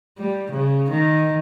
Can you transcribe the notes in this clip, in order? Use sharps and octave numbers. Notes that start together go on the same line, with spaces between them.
G3
C#3
D#3